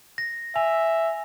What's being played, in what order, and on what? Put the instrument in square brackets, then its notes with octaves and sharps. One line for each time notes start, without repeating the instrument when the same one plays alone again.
[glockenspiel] A#6
[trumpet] E5 [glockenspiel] G#5 F7